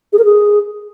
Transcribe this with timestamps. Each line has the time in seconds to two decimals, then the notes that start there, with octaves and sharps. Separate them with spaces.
0.13 G#4
0.18 A#4
0.24 G#4